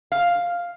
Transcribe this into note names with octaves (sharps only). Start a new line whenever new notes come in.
F5